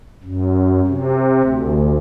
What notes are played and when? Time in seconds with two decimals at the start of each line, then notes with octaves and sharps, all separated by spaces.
0.23 F#2
0.87 C3
1.42 D2